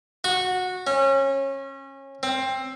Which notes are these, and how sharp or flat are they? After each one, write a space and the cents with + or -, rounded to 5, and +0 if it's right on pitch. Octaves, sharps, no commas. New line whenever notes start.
F#4 -15
C#4 -25
C4 +15